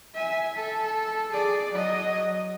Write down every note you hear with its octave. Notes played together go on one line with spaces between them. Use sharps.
E5 G#5
A4
G#4 D5
F#3 D#5